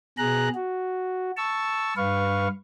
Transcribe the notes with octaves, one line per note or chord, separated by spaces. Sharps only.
B2 G#4 A#5 F#6
F#4
A5 C#6 E6
G2 B4 F5 C#6